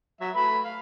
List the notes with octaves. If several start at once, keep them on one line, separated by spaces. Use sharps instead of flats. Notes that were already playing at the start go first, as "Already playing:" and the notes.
F#3 E5
A3 B4 B5
F5